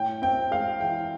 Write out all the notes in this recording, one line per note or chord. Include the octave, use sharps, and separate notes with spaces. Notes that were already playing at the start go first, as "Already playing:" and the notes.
Already playing: A2 G5
C4 G5
G#3 F5
E3 G5